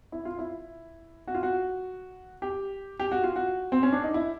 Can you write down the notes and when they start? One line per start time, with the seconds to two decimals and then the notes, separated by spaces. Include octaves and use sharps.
0.12 E4
0.25 F4
0.39 E4
1.28 F#4
1.35 F4
1.43 F#4
2.42 G4
3.00 G4
3.12 F#4
3.24 F4
3.36 F#4
3.72 C4
3.83 C#4
3.93 D4
4.04 D#4
4.14 E4